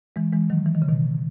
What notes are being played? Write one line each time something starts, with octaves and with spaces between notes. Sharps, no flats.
E3 G#3
E3 G#3
D#3 F#3
E3
D#3
C#3
B2 D#3